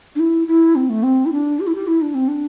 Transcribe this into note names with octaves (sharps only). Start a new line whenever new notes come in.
D4
E4
E4
C4
A3
C4
E4
D4
G4
E4
G4
E4
D4
C4
D4